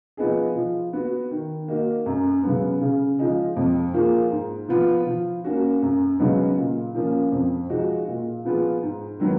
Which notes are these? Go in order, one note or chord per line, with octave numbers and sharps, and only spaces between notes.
F3 B3 D#4 G#4
F3
B3 F#4
D#3
A#3 D#4 F#4
F#2
C#3 F#3 B3
C#3
F3 G#3 D#4 G#4
F2
F3 A#3 F4 G#4
G#2
F3 B3 F4
F3
A#3 C#4 F#4
F#2
C#3 F#3 B3 D#4
A#2
F3 A#3 C#4 F4
F2
F3 G#3 D#4 F#4
A#2
F3 B3 F4 G#4
G#2
D#3 F#3 B3